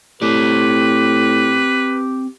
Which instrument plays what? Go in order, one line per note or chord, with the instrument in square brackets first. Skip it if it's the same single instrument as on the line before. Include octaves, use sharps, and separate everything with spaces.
[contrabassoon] A2 [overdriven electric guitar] C4 D5 [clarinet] G4 [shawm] B4